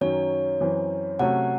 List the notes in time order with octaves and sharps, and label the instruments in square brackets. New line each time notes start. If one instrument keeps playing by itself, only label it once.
[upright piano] F#2 D#3 F#3 C#4 [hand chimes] C#5
[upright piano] F#2 E3 C4
[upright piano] C3 F#3 A3 C#4 [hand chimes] F#5